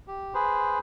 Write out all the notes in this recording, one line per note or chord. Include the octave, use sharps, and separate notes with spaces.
G4
G#4 B4 C5